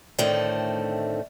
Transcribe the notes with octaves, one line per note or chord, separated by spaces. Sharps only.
A2 D3 D#3 A3 C4